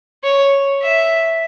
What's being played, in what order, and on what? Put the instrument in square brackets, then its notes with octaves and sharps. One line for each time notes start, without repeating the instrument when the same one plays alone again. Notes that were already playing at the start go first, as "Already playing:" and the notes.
[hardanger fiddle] C#5
E5